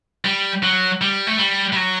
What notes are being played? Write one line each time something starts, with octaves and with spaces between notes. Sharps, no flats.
G3
F#3
G3
A3
G3
G3
F#3